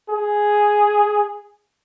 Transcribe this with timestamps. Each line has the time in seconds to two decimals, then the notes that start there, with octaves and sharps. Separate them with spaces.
0.10 G#4